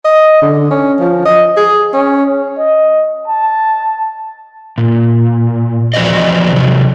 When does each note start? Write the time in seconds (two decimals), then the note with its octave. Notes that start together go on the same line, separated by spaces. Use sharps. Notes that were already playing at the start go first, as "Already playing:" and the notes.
0.05 D#5
0.42 D3
0.71 C#4
1.00 F3
1.26 D#5
1.57 G#4
1.94 C#4
2.58 D#5
3.27 A5
4.78 A#2
5.94 E3 F3 F#4 C5 D5 D#5
6.53 C3 F#3